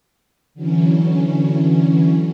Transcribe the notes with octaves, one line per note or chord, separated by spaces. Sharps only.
D3 E3 F#3 C#4